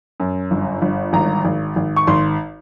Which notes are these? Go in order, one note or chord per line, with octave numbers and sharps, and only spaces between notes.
F#2
G1
G1
G#1 A#5
G#1
G#1
C#6
G#1 C6